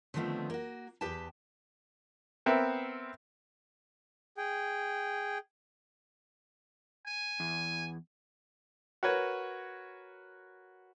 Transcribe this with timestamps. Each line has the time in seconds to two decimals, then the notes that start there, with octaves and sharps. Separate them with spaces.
0.14 D3 D#3 F3 A3 B3 C4
0.50 A#3 F#4
1.01 E2 G4 B4 G5 A5
2.46 B3 C4 A#4 E5
4.37 G#4 G5
7.07 G#5
7.40 E2
9.03 F#4 A#4 B4 C#5